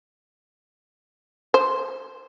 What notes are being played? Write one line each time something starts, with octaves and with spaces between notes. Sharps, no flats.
C5